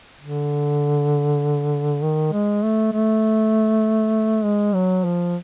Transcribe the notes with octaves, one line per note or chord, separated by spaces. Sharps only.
D3
D#3
G#3
A3
A3
G#3
F#3
F3